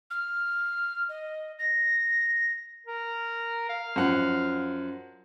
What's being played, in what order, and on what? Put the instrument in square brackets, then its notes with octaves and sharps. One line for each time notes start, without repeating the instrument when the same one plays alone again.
[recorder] F6
D#5
A#6
[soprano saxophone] A#4
F5
[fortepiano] F#2 F3 F#5